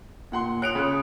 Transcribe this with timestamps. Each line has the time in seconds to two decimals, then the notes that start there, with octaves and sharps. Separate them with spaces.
0.32 A#2 F#5 C6
0.62 C#5 D#6 F#6 D7 F7
0.75 C#3 F#6